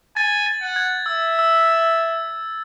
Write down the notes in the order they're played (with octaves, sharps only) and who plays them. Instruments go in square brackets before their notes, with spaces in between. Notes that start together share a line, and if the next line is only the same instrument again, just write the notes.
[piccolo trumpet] G#5 [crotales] A6
[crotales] A6
[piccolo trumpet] F#5
[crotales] G#6
[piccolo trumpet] E5 [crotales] E6
[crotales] E6